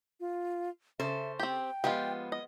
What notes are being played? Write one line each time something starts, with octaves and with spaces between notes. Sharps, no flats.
F4
C#3 A4 C5 E5
C4 G4 G5
F3 G#3 B3 F4 G4
D#5